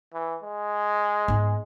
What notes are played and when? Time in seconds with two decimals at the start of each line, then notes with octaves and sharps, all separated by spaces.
0.13 E3
0.43 G#3
1.28 G#2 B3